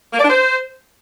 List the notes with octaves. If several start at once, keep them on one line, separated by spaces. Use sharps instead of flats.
A#3
D5
D4
C5